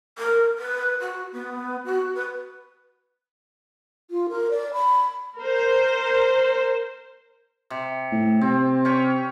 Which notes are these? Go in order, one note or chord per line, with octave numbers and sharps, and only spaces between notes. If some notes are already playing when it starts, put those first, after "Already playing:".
A#4
B4
F#4
B3
F#4
B4
F4
A#4
D5
B5
A#4 C5
C3
A2
C3 C4
C#4 G5 C#6